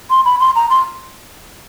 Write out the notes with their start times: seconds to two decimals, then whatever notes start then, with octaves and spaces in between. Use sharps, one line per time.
0.10 C6
0.25 B5
0.40 C6
0.56 A#5
0.70 C6